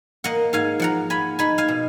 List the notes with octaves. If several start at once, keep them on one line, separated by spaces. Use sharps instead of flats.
A#3 D#5 F#5
G#2 F5 G#5
F3 F#5 A#5
F4 G#5 B5
D#4 G#5 B5
F5 G#5
B2